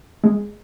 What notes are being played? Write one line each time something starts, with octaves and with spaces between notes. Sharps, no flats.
G#3